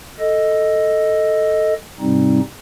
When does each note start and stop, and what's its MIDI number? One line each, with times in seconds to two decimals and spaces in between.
0.19 1.74 69
0.19 1.74 75
2.00 2.40 44
2.00 2.40 48
2.00 2.40 55
2.00 2.40 60
2.00 2.40 63